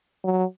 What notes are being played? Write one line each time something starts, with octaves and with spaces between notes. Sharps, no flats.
F#3